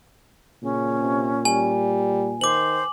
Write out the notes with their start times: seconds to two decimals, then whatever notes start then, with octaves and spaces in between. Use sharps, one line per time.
0.63 A#2 C#3 C#4
1.00 C3
1.45 G3 G#5
2.41 D#3 C5 D6 F#7